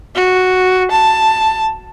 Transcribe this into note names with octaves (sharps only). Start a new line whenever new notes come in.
F#4
A5